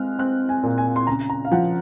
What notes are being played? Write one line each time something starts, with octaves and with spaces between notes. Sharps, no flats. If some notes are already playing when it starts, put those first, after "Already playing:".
Already playing: G#3 C4 F6 F#6
C4 F#6
G#5
A#2
G#5
C6
C#3 A#5
A#5
F5
F3 F#5